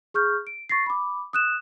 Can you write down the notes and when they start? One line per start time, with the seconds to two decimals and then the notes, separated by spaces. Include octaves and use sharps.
0.14 G#4 C#6 F6 G6
0.47 D7
0.69 C#6 A6 A#6 C7
0.86 B5 D6
1.33 D#6 F#6 E7